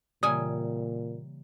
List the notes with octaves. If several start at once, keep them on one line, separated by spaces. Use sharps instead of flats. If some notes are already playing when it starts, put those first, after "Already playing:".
A#2 C#3 E3 G3 A#3 G#5 D#6